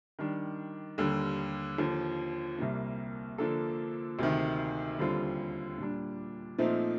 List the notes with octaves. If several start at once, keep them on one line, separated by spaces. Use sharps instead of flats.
D#3 G3 D4
D#2 D3 G3
D#2 D3 F3
C2 C3 G3 A#3
D3 F3 A#3 D4 A4
D2 C3 D#3
D#2 D3 G3 C4 F4
A#2 G3 D4
A#2 F3 A3 C4 D#4